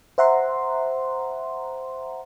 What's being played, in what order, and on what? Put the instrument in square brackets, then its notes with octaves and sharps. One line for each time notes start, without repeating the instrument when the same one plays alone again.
[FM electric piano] C5 E5 F#5 A#5 C6